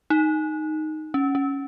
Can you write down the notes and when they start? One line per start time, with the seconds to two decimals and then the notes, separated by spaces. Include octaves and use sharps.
0.10 D#4
1.14 C#4
1.35 C#4